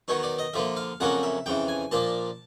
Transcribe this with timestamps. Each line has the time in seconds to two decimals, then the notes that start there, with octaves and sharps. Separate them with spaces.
0.08 D#3 F#3 B3 D#4 C#5
0.23 D5
0.39 D#5
0.54 D3 F3 A#3 E5
0.76 F5
1.00 F2 C#3 F#3 A#3 C#4 F#5
1.23 E5
1.46 F2 C#3 E3 G5
1.68 G#5
1.91 A#2 F3 A#3 D4 A5